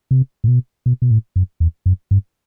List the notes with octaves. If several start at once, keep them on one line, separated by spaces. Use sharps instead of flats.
C3
A2
B2
B2
B2
A2
F#2
E2
F#2
G2